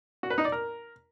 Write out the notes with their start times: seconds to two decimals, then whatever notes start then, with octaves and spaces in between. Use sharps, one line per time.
0.23 F#4
0.30 B4
0.38 D#4
0.45 D5
0.52 A#4